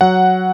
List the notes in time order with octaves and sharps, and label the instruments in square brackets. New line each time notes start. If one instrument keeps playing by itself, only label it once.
[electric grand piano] F#3 F#5